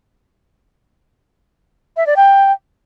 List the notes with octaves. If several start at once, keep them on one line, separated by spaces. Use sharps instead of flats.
E5
D5
G5